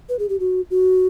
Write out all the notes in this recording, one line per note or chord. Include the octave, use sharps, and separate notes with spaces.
B4
G#4
G4
F#4
F#4